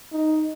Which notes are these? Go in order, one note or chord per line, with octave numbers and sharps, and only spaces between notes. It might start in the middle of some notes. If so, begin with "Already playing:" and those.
D#4